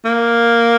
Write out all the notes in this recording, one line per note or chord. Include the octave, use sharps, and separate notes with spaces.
A#3